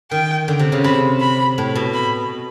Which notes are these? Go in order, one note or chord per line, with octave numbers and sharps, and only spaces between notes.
D#3 G5
D3
C3
C#3
C3 B5
B5
A2
B2
B5